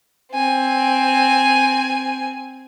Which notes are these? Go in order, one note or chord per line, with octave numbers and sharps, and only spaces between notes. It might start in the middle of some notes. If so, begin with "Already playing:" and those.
C4 G#5